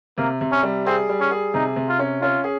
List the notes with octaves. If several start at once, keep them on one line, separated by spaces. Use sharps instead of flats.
C3 A#3
C3
C#4
G3
C4 G#4
G3
C#4
G#4
C3 D#4
C3
F4
C#4
C#4 F4
G#4